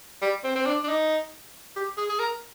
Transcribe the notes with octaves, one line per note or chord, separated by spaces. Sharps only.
G3
C4
C4
D4
D4
D#4
G4
G#4
G#4
A#4